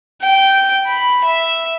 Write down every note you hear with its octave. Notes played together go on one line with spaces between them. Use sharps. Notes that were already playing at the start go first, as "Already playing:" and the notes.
G5
B5
E5